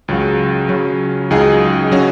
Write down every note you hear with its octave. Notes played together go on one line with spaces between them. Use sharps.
C#2 C#3 F#3
C#3 F#3 C#4
C#2 C#3 F#3 D#4 G#4
F#3 C#4 F#4